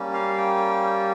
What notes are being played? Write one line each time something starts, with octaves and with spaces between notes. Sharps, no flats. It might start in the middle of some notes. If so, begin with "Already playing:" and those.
Already playing: G3 A#3 C#4
F5
G5